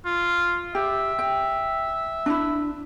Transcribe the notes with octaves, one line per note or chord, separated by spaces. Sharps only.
F4
G4 E5
G5
D4 E4